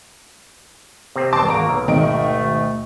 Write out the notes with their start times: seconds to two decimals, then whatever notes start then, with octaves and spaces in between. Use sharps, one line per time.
1.16 C3 C4
1.33 C#2 E3 G3 A5 C6 D6
1.48 G#1 A#3 F#4 A#5 D7
1.69 B1
1.88 G#1 D2 B2 D#3 A3 D#5 D7